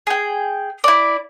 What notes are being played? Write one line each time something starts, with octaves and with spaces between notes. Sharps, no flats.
G#4 G5
E4 D5